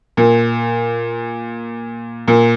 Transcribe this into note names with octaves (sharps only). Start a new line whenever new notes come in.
A#2
A#2